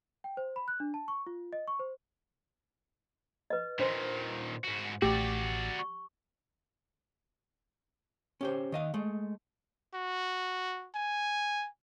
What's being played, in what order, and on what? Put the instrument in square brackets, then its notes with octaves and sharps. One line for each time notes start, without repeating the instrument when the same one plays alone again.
[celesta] G5
C5
B5
F#6
D4
A5
C#6
F4
D#5
C#6
C5
[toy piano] B4 D#5
[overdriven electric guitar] A#2 D#3 [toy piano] D4 C5 C6
[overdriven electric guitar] G#2 F#4
[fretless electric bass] A1 A3 [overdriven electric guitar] F#4 D5 [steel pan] G4
[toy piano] C#6
[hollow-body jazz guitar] C#4 G4 C5
D#3 D#5 F5
G#3 A3
[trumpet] F#4
G#5